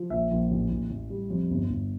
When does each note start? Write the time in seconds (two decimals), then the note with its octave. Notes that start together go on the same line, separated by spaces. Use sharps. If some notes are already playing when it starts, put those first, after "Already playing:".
Already playing: F3
0.10 A#1 E5
0.31 A#1
0.51 A1
0.70 A1
0.90 A1
1.10 G3
1.30 F2
1.51 G1
1.70 G1